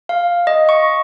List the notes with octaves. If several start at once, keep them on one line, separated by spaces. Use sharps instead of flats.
F5
D#5
C#6